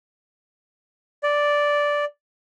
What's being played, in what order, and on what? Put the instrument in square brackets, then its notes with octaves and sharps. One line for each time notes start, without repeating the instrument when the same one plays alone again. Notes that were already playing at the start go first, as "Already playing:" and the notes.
[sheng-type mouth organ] D5